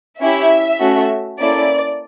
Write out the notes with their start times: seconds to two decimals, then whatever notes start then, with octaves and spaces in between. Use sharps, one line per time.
0.21 C#4 E4 G4 E5
0.79 A3 C#4 F#4 A4
1.38 A#3 C#4 E4 A4 D5